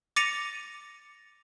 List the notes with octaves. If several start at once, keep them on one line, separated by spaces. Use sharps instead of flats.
D6 A6 A#6 C#7 D#7 F7